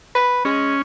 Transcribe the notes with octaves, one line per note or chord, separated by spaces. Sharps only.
B4
G#3 C#4